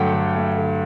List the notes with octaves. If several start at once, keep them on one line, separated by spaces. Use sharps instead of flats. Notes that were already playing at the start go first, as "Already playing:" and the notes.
Already playing: G2 D3 F#3 A3 F#5 G5
D3
A3
D3